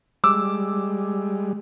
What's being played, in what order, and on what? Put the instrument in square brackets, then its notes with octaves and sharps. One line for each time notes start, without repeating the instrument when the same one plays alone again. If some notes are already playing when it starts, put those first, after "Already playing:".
[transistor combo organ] G3 G#3 [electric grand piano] D6 E6